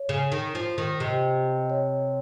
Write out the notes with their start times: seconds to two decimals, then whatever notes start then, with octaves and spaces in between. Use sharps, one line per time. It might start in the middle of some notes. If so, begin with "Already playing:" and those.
Already playing: C#5
0.09 C#3
0.32 D#3
0.55 F3
0.78 D#3
1.00 C3 D#5
1.70 C#5